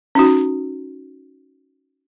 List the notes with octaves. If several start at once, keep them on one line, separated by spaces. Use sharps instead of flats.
C#4 D#4 F#4